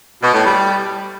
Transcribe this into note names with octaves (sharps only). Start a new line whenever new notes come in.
B2
A2
G3